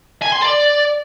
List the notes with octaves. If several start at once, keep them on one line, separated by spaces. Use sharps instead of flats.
G#5
C6
D5